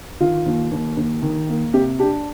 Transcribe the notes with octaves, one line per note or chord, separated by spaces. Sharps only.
D#3 F4
D#2
D#2
D#2
D#3
A#3
C3 G4
D4 G4